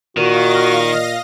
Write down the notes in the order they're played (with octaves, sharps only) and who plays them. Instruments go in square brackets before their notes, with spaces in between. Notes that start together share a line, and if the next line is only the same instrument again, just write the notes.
[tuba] A#2 [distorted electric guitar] D#3 [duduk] F#4 [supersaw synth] D#5 F5 A#6